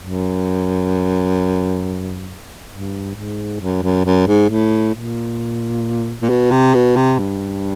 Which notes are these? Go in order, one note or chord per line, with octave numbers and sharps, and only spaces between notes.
F#2
G2
G#2
F#2
F#2
F#2
G#2
A2
A#2
A#2
B2
C3
B2
C3
G2